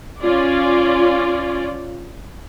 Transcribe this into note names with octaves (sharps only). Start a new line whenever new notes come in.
C#4 F4 D5